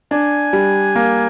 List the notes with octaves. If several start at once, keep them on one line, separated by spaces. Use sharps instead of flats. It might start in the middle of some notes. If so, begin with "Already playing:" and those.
D4 G#5
G3
A#3